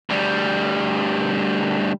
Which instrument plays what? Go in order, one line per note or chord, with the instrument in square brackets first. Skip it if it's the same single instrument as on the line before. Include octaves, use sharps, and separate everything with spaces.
[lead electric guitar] D2 G3